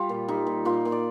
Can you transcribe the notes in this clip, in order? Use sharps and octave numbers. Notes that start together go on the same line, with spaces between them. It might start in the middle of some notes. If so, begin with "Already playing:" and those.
Already playing: G3 F4
A#2
G3 D#4
A#2
A#2 F4
A#2
D5